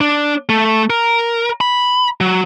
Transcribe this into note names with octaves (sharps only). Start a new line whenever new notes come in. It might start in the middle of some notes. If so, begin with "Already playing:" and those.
D4
A3
A#4
B5
F#3